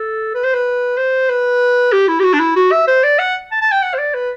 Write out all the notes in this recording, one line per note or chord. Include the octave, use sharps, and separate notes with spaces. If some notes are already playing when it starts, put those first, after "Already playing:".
Already playing: A4
B4
C5
B4
C5
B4
G4
E4
G4
F#4
D4
E4
F#4
E5
C5
D5
F#5
A5
A5
G5
F#5
C5
D5
B4